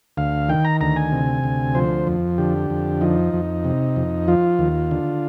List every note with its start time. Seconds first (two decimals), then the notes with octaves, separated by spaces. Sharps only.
0.17 D2 F5
0.49 D#3 G5
0.65 A#5
0.81 D2 A#5
0.96 G#5
1.12 C3
1.44 D2
1.75 F3 C5
2.07 F2
2.38 D3 G4
2.70 F2
3.01 F3 D#4
3.34 F2
3.64 C3
3.96 F2
4.28 F3 F4
4.59 D#2
4.91 D3